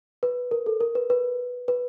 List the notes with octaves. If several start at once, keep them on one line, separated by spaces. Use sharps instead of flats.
B4
A#4
A4
A#4
B4
B4
B4